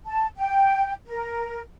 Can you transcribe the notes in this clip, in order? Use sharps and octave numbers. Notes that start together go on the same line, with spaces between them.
A5
G5
A#4